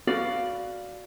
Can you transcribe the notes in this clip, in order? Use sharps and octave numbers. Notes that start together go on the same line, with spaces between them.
F#4 B4 D5 F5